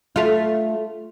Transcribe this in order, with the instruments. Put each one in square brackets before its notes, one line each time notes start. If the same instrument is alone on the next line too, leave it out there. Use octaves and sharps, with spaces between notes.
[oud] A3 F4